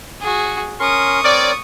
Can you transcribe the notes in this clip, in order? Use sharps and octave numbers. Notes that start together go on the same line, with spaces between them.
F#4 G#4
C#4 A#4 C6 C#6 D#6
C4 A#4 C#5 D5